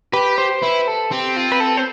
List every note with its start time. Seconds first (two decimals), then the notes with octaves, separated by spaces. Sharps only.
0.13 G4 B4
0.38 C5
0.62 E4 B4
0.88 A4
1.11 C4 G4
1.36 F4
1.52 B4
1.60 A4
1.77 C5